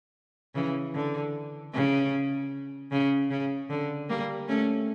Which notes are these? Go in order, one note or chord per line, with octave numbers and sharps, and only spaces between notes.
C#3 E3
D3
C#3
C#3
C#3
D3
G3 A#3
A3 C#4